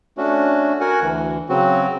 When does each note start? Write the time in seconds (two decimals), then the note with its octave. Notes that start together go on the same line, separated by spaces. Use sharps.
0.18 A3 C#4 D4 F#4
0.81 F#4 A#4 F#5 G#5
1.02 D2 E3
1.49 C#3 F#3 C4 F#4